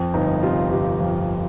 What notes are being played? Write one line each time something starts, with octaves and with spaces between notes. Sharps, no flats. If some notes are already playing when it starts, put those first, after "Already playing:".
Already playing: F2
G1 D#4
C3 F4
G1 G4
F2